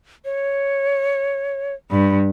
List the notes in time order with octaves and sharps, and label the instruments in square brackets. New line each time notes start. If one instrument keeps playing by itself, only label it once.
[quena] C#5
[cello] G2 [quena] B5